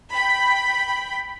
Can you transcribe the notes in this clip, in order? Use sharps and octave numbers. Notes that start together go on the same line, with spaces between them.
G5 B5